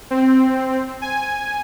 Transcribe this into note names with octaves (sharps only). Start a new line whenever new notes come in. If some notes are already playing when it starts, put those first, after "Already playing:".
C4
G#5